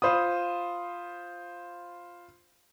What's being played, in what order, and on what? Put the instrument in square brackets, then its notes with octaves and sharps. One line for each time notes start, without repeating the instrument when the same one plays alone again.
[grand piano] F4 C5 B5 D#6